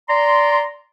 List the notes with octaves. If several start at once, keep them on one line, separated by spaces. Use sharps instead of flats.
D5 A#5 C6